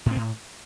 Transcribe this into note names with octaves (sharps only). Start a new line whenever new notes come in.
A2
C4
A2